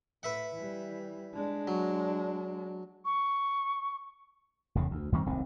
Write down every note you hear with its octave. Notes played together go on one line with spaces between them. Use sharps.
A2 B4 E5 F#5
E3 G3
G#3 D4
F#3
C#6
F1 E2 C#3
D2
D#2 D#3 G3 C4
D1 C2 D#3 C4